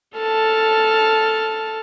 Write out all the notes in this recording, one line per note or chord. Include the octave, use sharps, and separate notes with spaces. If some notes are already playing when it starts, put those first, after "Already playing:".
A4 A5 F6